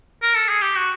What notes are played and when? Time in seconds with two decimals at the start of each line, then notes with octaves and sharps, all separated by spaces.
0.23 A#4
0.35 A4
0.49 G#4
0.62 G4
0.76 F#4